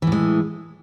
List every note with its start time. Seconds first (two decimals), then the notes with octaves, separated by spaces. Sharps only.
0.02 E3
0.07 A2
0.12 G#3